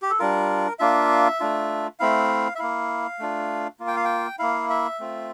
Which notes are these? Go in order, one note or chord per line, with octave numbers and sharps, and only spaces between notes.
G4
A4
G3 D4 F4 A#4
A#3 D4 F4 E5
A3 D4 F4
A3 C4 E4 F5
E5
A#3 E4 F5
A3 D4 F4
A#3 F4
G5
F5
G5
A#3 E4 F5
E5
A3 C4 F4